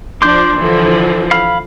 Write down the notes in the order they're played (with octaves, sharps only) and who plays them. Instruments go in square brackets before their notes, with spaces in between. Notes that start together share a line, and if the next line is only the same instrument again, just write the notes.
[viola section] F3 D4 [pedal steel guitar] C6 D6 G6
[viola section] D3 E3 F3
[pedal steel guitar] F5 B5 F6